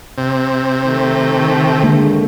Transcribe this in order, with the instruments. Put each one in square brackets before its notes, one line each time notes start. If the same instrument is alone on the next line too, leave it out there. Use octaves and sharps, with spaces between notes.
[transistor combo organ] C3
[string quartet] D#3 A3
[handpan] D3 G#3 A#3